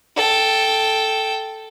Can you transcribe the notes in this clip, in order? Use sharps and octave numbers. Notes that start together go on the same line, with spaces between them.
A4 G5